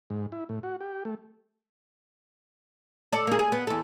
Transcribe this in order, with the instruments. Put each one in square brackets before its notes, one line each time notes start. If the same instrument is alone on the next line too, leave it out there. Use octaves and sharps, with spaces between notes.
[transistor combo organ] G#2
E4
A2
F#4
G4
A3
[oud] A4 D5
A#3 G#4
G#4
B3
E2 A4